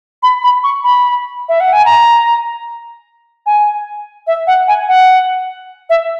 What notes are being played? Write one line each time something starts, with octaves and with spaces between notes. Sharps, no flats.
B5
B5
C#6
B5
E5
F#5
G#5
A#5
G#5
E5
F#5
G#5
F#5
E5